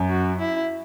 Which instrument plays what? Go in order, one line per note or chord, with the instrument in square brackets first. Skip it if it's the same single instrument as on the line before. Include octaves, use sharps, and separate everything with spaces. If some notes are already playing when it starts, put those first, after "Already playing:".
Already playing: [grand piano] F#2
[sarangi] F#4
E4